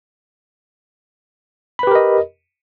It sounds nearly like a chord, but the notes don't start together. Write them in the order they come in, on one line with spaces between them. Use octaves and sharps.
B5 B4 G4 A#4 D#5